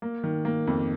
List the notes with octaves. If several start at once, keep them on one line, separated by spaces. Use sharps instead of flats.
A#3
D#3
A#3
F2